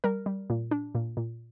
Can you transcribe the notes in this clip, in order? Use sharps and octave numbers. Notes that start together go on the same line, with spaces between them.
G3 A#4
G3
A#2
D4
A#2
A#2